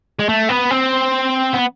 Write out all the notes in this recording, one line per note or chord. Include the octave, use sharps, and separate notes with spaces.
G#3
A3
B3
C4
B3